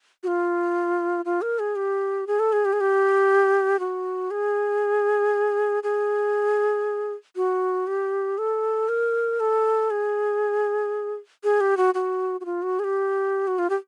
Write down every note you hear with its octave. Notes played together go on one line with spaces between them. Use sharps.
F#4
F4
F4
A#4
G#4
G4
G#4
A4
G#4
G4
G#4
G4
F#4
G#4
G#4
F#4
G4
A4
A#4
A4
G#4
G#4
G4
F#4
F#4
F#4
F4
F#4
G#4
G4
F#4
F4
G4